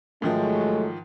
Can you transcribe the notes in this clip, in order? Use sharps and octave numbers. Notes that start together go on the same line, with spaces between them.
G#2 D#3 F3 F#3 G#3 A3